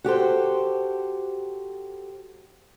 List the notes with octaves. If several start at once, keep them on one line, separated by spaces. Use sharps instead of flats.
F#4 G4 A4 C5